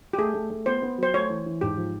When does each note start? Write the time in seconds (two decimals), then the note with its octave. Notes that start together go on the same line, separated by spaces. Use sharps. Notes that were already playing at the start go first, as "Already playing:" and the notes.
0.13 G4
0.18 A3 G#4
0.34 A3
0.50 A3
0.66 B3 C5
0.82 B3
0.98 F#3 C5
1.14 A3 C#5
1.30 E3
1.46 E3
1.61 G#2 G4
1.77 F3